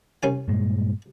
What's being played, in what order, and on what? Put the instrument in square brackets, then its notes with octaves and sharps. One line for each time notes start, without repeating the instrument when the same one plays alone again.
[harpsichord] C2 C#4 G#5
[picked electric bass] G2 A#2 G#3